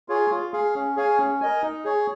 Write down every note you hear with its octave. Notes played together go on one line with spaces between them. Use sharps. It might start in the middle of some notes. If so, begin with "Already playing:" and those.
F4 G#4 C#5
F4
G#4 F5
C#4
G#4 C#5 F5 G#5
C#4
A#4 D#5 G#5
D#4
G#4 C#5